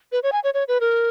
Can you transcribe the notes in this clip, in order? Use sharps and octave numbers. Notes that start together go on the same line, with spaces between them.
B4
C#5
G#5
C#5
C#5
B4
A#4